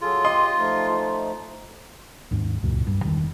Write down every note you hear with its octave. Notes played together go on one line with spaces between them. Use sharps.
F#3 F4 G#4 A4
G4 D#5 C6
F3 A3 D#4
D#2 G#2
C#2 F#2 A#2
G2
E1 D#3